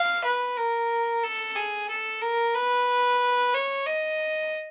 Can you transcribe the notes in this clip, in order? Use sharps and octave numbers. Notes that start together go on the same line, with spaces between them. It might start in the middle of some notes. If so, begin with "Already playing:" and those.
Already playing: F5
B4
A#4
A4
G#4
A4
A#4
B4
C#5
D#5